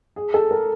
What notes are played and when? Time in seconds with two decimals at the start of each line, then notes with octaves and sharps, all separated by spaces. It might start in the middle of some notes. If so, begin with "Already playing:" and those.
0.16 G#4
0.34 A4
0.51 A#4